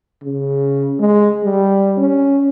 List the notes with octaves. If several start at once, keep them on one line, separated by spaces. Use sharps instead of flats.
C#3
G#3
G3
C#4